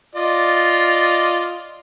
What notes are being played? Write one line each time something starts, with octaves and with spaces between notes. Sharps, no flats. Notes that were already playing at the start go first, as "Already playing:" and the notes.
F4 D5 D#5